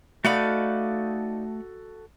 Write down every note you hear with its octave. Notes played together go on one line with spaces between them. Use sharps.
A3 D#4 F#4 A4 D5 F5 F#5 B5